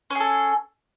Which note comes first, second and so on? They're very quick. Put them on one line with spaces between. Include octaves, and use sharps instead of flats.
C#4 G#4 A4